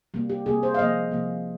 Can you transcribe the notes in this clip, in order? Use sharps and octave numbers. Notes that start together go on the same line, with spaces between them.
C3 G3 A#3
G4
C3 G3 A#3 G#4
C5
F5
C3 F3 A#3 D#5
C3 F3 A#3